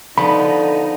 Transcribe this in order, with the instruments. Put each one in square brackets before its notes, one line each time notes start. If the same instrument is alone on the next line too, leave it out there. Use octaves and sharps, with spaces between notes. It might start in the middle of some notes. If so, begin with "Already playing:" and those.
[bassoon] D3 [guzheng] F3 B3 [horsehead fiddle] D#4 [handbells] B5